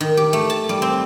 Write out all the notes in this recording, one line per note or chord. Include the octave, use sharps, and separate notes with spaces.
D#3
G4
A3
A5
G3
C4